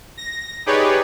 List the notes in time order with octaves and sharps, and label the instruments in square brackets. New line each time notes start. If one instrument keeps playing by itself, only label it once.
[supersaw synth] A#6
D#4 G4 G#4 B4 C#5 D5